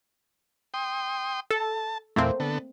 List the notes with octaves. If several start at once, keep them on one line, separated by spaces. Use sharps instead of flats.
G5 C6 D#6
A4 A5
E2 A#2 A3 A#3 C4
D3 B3 A4